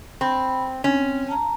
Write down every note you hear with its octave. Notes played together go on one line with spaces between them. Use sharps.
C4 B5
C4 C#4
A5 A#5